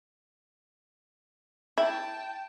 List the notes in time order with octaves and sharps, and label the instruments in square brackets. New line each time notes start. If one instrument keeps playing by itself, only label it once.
[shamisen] E4 [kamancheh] G5 A5